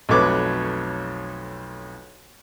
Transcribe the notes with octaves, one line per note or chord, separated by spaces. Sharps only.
B1 F2 A3 B4 C#5 D6